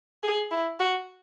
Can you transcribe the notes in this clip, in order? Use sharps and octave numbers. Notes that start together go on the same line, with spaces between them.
G#4
E4
F#4